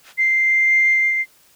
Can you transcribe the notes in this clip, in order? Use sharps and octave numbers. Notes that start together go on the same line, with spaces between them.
C7